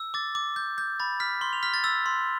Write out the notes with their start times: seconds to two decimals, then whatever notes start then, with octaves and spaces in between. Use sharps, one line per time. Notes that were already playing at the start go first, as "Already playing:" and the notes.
Already playing: E6
0.14 D6 A6
0.35 D6
0.56 G6
0.78 G6
1.00 B5 A6
1.20 F6 B6
1.41 C6 G7
1.53 F7
1.63 F6 B6
1.74 A6
1.84 E6 A6
2.06 C6